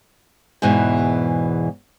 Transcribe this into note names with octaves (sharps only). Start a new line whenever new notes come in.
E2 G#2 B2 E3